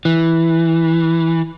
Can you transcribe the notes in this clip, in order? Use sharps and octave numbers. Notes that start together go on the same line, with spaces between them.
E3